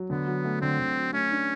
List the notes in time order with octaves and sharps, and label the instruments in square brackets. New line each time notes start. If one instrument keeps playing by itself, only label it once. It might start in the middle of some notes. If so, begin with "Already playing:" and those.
Already playing: [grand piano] F#3
[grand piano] D3 [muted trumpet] B3
[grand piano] F#3
A3
[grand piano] D3 [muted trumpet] C4
[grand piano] D3
F#3
[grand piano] A3 [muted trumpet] C#4
[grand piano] D4